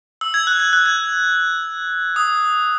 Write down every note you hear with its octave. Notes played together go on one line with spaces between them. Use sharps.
E6
G#6
F#6
G#6
F#6
G#6
D#6